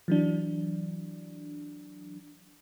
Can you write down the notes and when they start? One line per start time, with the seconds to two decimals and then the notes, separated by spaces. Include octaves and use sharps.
0.08 E3 F#3 D4